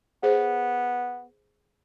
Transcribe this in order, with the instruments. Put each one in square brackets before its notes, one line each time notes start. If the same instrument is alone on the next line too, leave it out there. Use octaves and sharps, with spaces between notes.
[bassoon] B3 [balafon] G#4 C5